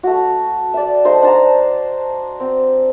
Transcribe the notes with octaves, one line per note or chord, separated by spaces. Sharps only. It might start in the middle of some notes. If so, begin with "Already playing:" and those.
A3 F#4
D5 E5
A3 D#4 C5
D4 A5 A#5
C4